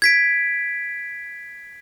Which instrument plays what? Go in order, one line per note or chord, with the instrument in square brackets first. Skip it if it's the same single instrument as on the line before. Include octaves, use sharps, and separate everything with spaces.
[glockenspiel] G#6 B6 D7